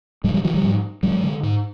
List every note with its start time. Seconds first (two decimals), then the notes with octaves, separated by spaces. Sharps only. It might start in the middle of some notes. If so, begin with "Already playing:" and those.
0.24 G2 F#3 G#3
0.34 F3 G3
0.44 D3 E3 F#3
0.54 F3 G3
0.64 G#2
1.03 G2 F#3 G#3
1.23 D3
1.43 G#2